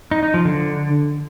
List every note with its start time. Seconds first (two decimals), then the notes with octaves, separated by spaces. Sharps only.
0.11 D#4
0.23 D#4
0.34 F3
0.45 D3